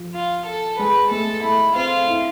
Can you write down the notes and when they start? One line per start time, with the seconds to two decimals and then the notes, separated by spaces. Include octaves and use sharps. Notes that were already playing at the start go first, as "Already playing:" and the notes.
Already playing: F3
0.14 F4
0.46 A4
0.79 G#3 B4
1.11 A3 A4
1.43 A3 E4
1.75 C4 F4
2.08 E4